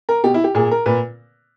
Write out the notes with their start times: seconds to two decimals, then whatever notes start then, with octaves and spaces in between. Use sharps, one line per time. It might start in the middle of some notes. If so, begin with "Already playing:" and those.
0.09 A#4
0.24 B2 G4
0.34 E4
0.44 G4
0.55 A#2 G#4
0.71 A#4
0.86 A#2 B4